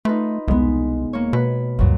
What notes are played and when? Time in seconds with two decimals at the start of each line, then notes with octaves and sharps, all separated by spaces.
0.05 A3 D#4 F4 B4
0.48 E1 C2 G#3 B3 D#4
1.13 A#3 C#5
1.33 B2 B4
1.79 D2 G2 A#2 F#3